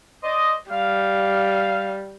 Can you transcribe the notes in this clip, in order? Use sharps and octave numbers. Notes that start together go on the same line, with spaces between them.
C5 D5 D#5
G3 F5